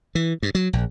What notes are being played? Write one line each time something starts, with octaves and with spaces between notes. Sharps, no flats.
E3
G2
F#3
A#1